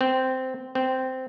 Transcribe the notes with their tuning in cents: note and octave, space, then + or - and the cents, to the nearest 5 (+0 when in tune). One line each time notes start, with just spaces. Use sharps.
C4 -10
C4 -10